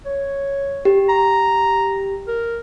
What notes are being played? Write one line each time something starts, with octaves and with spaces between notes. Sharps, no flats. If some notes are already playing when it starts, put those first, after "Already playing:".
C#5
G4
A#5
A#4